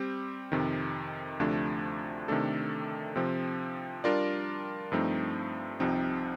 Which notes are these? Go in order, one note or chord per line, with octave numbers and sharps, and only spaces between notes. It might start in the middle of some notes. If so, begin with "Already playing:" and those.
Already playing: G3 C4 G4
F2 C3 D#3
D2 C3 F3 A3 D4
C3 D#3 A3 D4 A4
C3 F3 C4
G3 D4 F4 A#4 D5
G2 F3 A3 C4 D#4
C2 C3 F3 C4 D#4